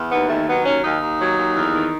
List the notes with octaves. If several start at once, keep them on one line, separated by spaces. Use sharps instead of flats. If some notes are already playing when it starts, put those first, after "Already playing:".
Already playing: E2
D#2 B3
D#3 A3
F#3 B3
D#2 C#4
D#2 D#4
D#2
F#3
D#2
E2
D#3